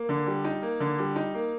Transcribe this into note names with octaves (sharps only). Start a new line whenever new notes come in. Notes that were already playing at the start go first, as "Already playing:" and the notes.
Already playing: A#3
D3
G3
D#4
A#3
D3
G3
D#4
A#3